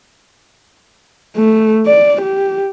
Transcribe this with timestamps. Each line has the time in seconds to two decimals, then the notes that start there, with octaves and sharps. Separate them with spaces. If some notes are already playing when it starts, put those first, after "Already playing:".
1.36 A3
1.86 D5
2.22 G4